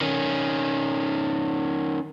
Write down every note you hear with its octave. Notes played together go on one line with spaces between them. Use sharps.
D#3 C#4